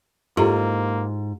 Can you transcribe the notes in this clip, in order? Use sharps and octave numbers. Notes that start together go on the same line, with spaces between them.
G#2 A#3 E4 F4 G4 A4 A#5